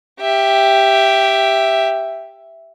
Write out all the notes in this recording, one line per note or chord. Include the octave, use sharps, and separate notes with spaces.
G4 E5